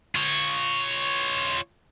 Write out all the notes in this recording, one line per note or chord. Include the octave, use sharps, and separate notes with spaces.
F4 C#5